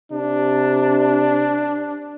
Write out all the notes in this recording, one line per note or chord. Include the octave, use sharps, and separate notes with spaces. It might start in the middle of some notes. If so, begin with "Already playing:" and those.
C3 D4